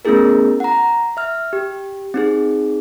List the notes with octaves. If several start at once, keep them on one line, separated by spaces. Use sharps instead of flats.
A3 B3 C#4 E4 G#4 A#4
F#5 A#5
E5 F6
G4
C4 D#4 G#4